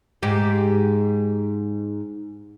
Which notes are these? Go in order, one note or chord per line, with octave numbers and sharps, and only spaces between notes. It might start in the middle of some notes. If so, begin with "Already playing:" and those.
G#2 G4